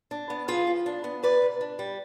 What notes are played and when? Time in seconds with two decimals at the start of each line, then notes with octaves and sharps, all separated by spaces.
0.11 D4
0.30 B3
0.48 F3 F4 G#4
0.67 F3
0.86 D4
1.04 B3
1.23 C3 B4 D5
1.42 C3
1.61 D4
1.79 G3